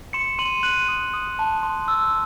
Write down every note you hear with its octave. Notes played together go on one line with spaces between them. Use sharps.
C6 C#7 E7
C6 D#7 F#7
F#6 D#7 F#7
D#6
D#6
A5
C6
E6